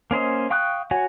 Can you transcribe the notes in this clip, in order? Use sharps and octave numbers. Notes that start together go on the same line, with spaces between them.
A#3 C#4 C5 D#5
F5 G5 C#6 D#6 F#6
F#4 C#5 F#5 G#5